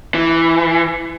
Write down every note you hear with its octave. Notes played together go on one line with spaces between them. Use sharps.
E3